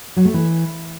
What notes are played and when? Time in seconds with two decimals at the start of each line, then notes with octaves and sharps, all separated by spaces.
0.16 F#3
0.25 A3
0.34 E3